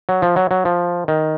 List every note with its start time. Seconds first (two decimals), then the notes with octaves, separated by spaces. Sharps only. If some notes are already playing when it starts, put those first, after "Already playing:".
0.09 F#3
0.22 F3
0.36 F#3
0.51 F#3
0.65 F3
1.08 D#3